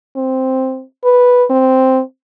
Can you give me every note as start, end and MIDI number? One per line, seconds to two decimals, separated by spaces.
0.16 0.83 60
1.04 1.45 71
1.50 2.01 60